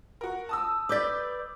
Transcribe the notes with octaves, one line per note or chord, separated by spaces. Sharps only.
F#4 A#4
A5 D#6 E6
B4 D5 D6 G6 B6